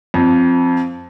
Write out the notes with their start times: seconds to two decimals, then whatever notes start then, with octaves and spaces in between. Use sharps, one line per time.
0.14 F2